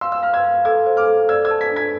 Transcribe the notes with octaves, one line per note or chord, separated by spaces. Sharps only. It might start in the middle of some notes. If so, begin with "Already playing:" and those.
F5 C6 E6
E6
F5 F6
E6 G#6
F5
A4 E6 G#6
C5
D6 F6
A4
D5 E6 G#6
E6 G#6
A5
G#6 B6
D4
G#6 B6